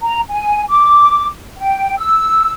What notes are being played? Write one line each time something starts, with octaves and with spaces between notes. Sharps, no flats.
A#5
G#5
D6
G5
E6